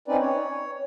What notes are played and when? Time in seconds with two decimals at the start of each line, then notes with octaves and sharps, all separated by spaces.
0.08 C4 C#4 D#4 B4 D5
0.21 C#5